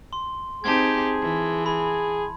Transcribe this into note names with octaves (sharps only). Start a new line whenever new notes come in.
C6
C4 D#4 G4 G#4 A5 C6 G#6
E3
G#4 B5